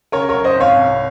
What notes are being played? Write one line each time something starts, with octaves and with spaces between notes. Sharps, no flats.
C#3 A#4 C#5
F#2 A#4 C#5
C5 D#5
G#1
C#5 F5
C2